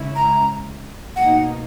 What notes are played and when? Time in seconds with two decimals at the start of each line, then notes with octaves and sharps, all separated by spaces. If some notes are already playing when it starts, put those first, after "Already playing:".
Already playing: C#3 G#3 C#4 E4
0.15 A#5
1.16 B2 A#3 D#4 F#5